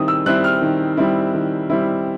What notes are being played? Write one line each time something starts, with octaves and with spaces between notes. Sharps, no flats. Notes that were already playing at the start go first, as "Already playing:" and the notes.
Already playing: D#3 G3 C4 E4 D#6
E6
G3 C4 E4 F#6
F6
D#3
G3 C4 E4
D#3
G3 C4 E4